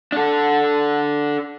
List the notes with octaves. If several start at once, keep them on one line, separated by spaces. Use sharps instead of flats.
D4 A4